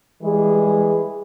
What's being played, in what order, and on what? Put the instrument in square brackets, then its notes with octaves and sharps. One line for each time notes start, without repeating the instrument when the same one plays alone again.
[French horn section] E3 G3 G#3 G#4